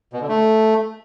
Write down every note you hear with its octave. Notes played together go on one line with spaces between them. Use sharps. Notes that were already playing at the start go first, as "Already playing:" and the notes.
B2
D3
A3